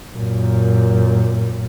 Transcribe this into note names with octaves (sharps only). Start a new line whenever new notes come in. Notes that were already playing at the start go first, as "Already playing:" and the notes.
F#2 A#2